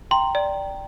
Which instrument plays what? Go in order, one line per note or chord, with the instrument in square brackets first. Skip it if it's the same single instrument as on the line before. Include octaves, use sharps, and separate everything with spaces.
[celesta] G5 A#5 [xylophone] C6
[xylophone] D5